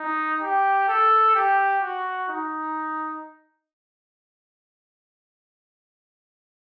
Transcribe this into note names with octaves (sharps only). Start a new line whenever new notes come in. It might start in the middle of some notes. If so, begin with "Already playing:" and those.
Already playing: D#4
G4
A4
G4
F#4
D#4